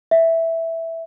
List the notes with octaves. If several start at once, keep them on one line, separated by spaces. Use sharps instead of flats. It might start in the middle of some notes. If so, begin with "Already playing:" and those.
E5